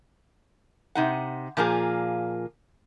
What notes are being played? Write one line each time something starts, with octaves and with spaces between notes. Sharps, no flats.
C3 D#4 F#5
A#2 F3 A#3 F4 G#4